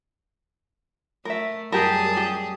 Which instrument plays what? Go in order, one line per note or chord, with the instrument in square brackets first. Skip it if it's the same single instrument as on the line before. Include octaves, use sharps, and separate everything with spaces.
[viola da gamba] A3 [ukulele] A#4 E5
[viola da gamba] F#2 G3 G#4 [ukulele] G4 A#4 [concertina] A5
[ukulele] G4